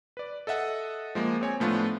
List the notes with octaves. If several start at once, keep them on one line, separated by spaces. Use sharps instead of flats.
B4 D5
A4 D#5 E5 F#5
F3 G#3 A#3
C4 C#5 G#5
A2 F3 A3 B3 D4 F4